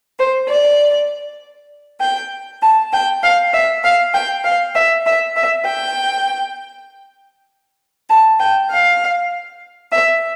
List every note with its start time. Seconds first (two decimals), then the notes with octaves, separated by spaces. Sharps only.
0.19 C5
0.49 D5
2.00 G5
2.62 A5
2.92 G5
3.22 F5
3.53 E5
3.84 F5
4.14 G5
4.44 F5
4.75 E5
5.06 E5
5.36 E5
5.66 G5
8.09 A5
8.39 G5
8.70 F5
9.92 E5